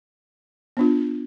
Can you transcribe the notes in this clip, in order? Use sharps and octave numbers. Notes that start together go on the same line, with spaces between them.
B3 D4 F4